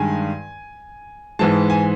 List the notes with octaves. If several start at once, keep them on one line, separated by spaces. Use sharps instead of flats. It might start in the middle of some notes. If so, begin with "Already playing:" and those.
Already playing: G2 D#3 G#3 G#5
G#2 E3 G#3 A5
G#5